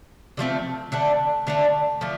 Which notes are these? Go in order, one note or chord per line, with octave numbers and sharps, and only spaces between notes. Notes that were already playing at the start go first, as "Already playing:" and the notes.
D3 F3 A3 C4
D3 A3 D4
D3 A3 D4
D3 F3 A3